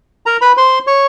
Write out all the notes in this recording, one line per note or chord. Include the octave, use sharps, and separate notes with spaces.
A#4 A#5
B4 B5
C5 C6
C#5 C#6